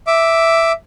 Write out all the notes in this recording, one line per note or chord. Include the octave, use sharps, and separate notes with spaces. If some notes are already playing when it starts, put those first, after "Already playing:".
E5 D6